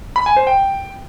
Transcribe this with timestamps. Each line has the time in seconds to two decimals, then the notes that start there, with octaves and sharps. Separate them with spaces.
0.16 B5
0.26 G#5
0.37 C5
0.47 G5